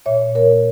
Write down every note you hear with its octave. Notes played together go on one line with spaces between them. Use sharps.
A#2 C#5 E5
A#2
A#3 A#4 C#5
A#3